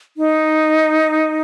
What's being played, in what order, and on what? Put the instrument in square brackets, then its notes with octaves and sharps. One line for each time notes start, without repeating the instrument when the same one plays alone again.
[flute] D#4